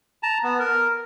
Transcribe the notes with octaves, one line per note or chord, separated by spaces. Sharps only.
A5 A#5
B3
A#4